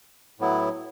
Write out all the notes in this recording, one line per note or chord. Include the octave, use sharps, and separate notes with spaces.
A2 F#3 B3 E4